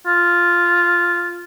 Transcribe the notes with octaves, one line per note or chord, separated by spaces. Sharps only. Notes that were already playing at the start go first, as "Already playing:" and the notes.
F4